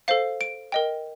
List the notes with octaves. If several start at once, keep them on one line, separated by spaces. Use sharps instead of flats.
A4 C5 F5 C7
D7
A#4 D#5 G5